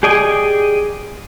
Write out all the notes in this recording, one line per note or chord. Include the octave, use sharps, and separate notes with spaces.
G4 G#4 D5 D#5 G#5